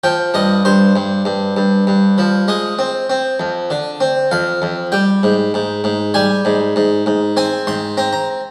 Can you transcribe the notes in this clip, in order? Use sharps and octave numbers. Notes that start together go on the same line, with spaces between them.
F3 G5
G2 D#5
G2 C5
G2
G2
G2
G2
F3
G#3 D#5
C4
C4
F2
D3
C4
F2 F5
F2
G3 G5
G#2
G#2
G#2
G3 G#5
G#2
G#2
G#2
C4 G#5
G#2 C6
C4 A#5
A#5